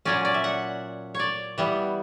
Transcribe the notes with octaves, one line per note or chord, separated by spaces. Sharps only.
A#2 F#3 C#4 D5
D5
E5
F#5
C#5 D5
E3 G3 B3